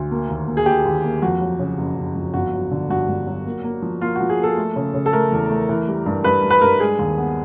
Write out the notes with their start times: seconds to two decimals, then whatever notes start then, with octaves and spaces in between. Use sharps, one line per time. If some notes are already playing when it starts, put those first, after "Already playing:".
Already playing: D2
0.11 A#3
0.29 D#2
0.47 A#3
0.57 G#4
0.66 A#3 G4
0.85 D#2
1.04 A#3
1.22 F2 F#4
1.41 F#3
1.59 C#3
1.78 F#1
1.97 F#1
2.16 F2
2.34 G1 F#4
2.53 F#3
2.71 D3
2.90 G2 F#4
3.08 G2
3.27 F#3
3.46 A#3
3.64 A#3
3.82 F3
4.01 A#3 F4
4.16 F3 F#4
4.30 G#4
4.39 A#3 A4
4.57 A3
4.76 C#3
4.94 C#3
5.06 A4
5.13 A3 A#4
5.32 E2
5.50 A3
5.69 E3
5.88 G3
6.06 G2
6.24 G2 B4
6.43 G3
6.50 B4
6.61 G2 A#4
6.80 G#3 G#4
6.99 D#2
7.18 B3